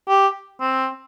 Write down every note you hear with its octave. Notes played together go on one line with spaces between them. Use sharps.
G4
C4